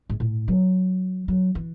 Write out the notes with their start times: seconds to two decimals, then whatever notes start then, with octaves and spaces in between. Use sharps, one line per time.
0.10 G#2
0.20 A2
0.48 F#3
1.28 F#3
1.55 E3